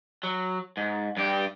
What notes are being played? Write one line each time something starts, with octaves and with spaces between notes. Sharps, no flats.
F#3
G#2
G2 G4